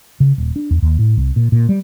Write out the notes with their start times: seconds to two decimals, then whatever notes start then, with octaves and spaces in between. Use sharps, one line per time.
0.20 C#3
0.38 D#1
0.56 D4
0.71 E2
0.82 D#2
0.99 A2
1.17 C2
1.36 A#2
1.52 A#2
1.69 G3